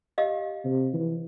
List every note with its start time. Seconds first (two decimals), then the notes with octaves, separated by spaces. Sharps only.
0.18 G4 D#5 F5
0.65 C3
0.93 E3